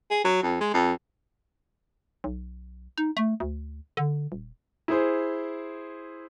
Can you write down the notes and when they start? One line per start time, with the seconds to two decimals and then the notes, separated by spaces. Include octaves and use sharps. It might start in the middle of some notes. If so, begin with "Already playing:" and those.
0.11 G#4
0.25 F#3
0.43 F2
0.61 G#3
0.74 F2
2.24 B1
2.98 D#4
3.17 A3
3.40 D2
3.97 D3
4.32 D#1
4.88 E4 G#4 C5